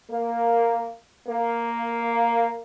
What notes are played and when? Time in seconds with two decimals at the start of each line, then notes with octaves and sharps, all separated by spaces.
0.10 A#3
1.27 A#3